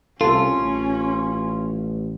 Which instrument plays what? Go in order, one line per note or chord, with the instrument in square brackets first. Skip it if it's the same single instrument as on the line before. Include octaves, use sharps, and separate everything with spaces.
[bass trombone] C2 [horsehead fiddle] C#4 [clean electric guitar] F4 [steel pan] A4
[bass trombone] A1